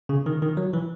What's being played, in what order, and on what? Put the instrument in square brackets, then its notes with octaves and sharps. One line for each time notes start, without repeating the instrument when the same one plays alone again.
[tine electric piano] C#3
D#3
D#3
F#3
E3